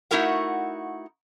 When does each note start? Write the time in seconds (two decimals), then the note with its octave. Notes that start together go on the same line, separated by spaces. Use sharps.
0.11 A3 D#4 E4 F#4 A#4 F#5